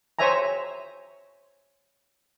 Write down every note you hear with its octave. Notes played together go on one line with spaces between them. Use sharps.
C5 C#5 E5 G#5 A#5